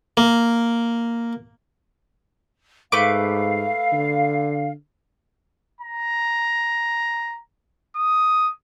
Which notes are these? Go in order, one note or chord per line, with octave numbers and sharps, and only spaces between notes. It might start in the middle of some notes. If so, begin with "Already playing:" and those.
A#3
G#2 A3 B4 F5 D6
D3
A#5
D#6